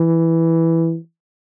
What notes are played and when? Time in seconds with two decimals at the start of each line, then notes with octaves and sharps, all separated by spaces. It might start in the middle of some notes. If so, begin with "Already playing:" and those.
Already playing: E3